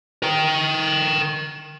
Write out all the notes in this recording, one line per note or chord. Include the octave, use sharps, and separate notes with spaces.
A#4 G5